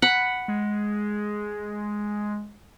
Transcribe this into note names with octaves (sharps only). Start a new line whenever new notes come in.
F#5 B5
G#3